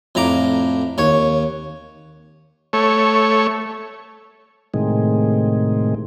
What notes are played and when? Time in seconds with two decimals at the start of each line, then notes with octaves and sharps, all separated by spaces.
0.15 F2 A2 A#5 D6
0.98 D#2 C#5
2.73 A3 C#5
4.74 A2 C3 D#3 G#3